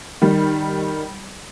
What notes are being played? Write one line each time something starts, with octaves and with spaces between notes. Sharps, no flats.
D#3 G3